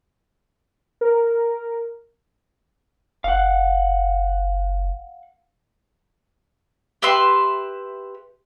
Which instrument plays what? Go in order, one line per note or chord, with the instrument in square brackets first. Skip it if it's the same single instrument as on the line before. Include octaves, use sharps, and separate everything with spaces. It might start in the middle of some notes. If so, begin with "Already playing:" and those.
[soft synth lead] A#4
[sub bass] F#1 [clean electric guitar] F5 F#5
[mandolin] G4 B4 E5 C6